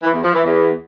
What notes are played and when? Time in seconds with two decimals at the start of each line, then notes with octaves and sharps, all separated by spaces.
0.03 E3
0.13 E2
0.23 F3
0.34 E3
0.44 E2